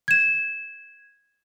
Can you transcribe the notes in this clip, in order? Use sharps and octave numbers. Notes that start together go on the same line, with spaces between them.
G#6 E7